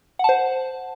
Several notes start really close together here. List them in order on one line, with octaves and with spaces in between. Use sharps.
F#5 A5 C5